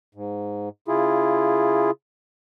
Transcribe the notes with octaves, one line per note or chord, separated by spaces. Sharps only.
G#2
C#3 E4 F4 G#4